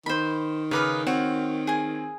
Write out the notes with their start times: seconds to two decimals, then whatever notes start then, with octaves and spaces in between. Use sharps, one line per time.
0.06 D#3 C5 B5
0.71 C#3 D#4 B4 D6 D#6 F6
1.07 C4 F#4 C#5
1.67 G#4 G#5